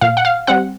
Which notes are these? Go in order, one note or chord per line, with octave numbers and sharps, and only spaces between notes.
A#2 F5
F#5
F5
G3 C4 F#5